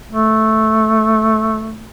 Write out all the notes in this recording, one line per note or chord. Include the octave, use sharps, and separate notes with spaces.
A3